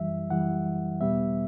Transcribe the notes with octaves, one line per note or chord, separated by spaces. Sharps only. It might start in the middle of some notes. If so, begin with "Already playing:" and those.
Already playing: F#2 E3 G3 E5
F#2 E3 G3 F#5
E2 B2 G3 B3 E5